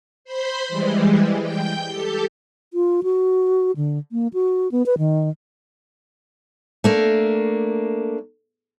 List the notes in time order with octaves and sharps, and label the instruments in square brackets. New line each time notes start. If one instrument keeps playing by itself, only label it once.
[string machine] C5 B5 C6
E3 G3 G#3
G5 G6
G4 A4
[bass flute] F4
F#4
D3
A#3
F#4
B3
B4
D#3
[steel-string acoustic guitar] A3 A#3 D4